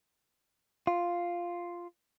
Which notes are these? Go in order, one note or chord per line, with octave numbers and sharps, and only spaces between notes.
F4